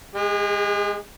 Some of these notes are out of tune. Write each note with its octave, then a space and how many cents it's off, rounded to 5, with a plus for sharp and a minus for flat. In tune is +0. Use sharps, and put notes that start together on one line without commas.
G#3 +0 G#4 -45